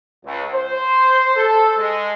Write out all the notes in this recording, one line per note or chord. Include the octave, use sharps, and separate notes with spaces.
C#2
C5
A4
G#3